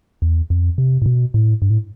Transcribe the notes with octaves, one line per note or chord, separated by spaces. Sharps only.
E2
F2
C3
A2
B2
A2
G2
A2